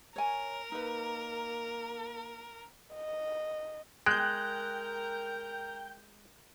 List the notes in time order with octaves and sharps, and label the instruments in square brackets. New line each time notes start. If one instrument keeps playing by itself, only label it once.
[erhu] A#4 [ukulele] C#5 G#5
[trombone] A#3 [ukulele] D#4 B4
[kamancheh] D#5
[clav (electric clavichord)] G#3 [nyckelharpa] A#4 A#5 [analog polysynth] G5 G6 [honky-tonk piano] F#6